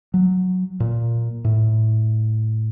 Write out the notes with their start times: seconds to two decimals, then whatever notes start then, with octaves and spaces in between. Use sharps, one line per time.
0.14 F#3
0.80 A#2
1.45 A2